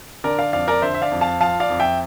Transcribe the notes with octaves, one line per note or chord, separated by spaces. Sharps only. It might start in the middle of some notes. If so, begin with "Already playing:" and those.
D3 A#4 D5
D5 F5
F2 D5 F5
A#4 D5
D3 C5 E5
E5
D5 F5
F2
F5 A5
F3 F5 A5
D5 F5
F2
E5 G5